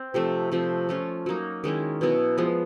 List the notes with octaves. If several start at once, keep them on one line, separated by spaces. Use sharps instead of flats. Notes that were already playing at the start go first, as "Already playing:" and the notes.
Already playing: C4
C3 F3 A3
C3 F3 A3
A3 C#4 F4
F#3 A#3 D#4
D#3 G#3 C#4 E4
B2 F#3 B3 E4
F3 G#3 B3